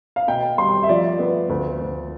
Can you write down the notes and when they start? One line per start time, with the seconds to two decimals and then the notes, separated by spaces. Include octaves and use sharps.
0.16 F5
0.27 B2 G5
0.58 G3 C6
0.83 E5
0.89 F3 D5
1.19 B3
1.49 D2
1.80 D2